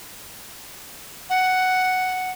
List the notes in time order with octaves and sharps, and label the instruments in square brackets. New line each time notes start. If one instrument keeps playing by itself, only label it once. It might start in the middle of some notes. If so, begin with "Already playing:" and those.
[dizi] F#5